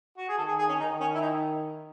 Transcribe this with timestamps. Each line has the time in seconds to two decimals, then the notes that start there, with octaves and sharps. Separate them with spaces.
0.18 F#4
0.29 G#4
0.38 D#3 A4
0.48 G#4
0.59 G#4
0.69 C#4
0.80 D#3 D#4
1.00 C#4
1.15 E4
1.21 D#4